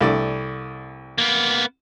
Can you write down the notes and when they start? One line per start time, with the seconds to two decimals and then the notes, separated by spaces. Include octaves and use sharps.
0.01 C2 A3 D5
1.18 A#3 B3